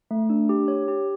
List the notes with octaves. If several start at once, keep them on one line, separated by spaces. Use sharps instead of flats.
A3
D4
G4
C#5
G4